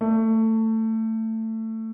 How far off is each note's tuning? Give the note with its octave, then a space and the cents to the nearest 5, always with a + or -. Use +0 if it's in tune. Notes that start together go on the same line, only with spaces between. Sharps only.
A3 +20